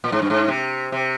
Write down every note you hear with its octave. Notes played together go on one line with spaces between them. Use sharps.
A#2
G#2
G2
G#2
C3
C3